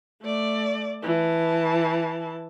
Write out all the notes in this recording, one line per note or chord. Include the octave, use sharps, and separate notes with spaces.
A3 D5
E3 A5